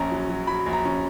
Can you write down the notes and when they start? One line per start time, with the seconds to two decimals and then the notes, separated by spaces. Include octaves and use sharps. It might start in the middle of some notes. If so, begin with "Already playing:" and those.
Already playing: A#1 C#4 A#5
0.11 F#3
0.29 F#3
0.47 F#3 B5
0.66 A#1
0.73 A#5
0.85 C#4